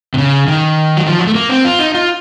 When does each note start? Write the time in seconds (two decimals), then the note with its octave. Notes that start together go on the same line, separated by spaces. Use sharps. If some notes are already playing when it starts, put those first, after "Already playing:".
0.14 C3
0.18 C#3
0.47 D#3
0.97 F#3
1.06 F3
1.19 F#3
1.27 A3
1.35 A#3
1.49 C4
1.65 F4
1.79 D#4
1.94 F4